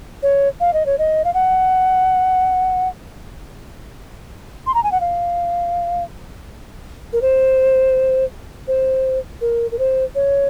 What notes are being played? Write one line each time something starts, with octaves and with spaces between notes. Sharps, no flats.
C#5
F5
D#5
C#5
D#5
F5
F#5
C6
A#5
G#5
F#5
F5
A#4
C5
C5
A#4
A#4
C5
C#5